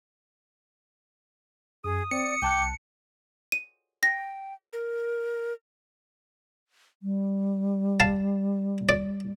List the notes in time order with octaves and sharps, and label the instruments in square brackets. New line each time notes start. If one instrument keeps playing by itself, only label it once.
[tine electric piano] F#2 [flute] G#4 [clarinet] D#6
[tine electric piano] C4 [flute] D5 [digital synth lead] C#7
[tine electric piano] C2 A5 F#6 [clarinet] G5 [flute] D6
[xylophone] D#7
[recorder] G5 [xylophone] A#6
[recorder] A#4
[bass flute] G3
[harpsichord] F5 A5
D5